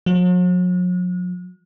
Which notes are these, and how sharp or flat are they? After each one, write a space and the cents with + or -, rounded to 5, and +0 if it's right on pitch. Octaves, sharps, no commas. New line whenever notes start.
F#3 -45